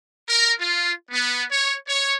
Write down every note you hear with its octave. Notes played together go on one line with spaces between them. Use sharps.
A#4
F4
B3
C#5
C#5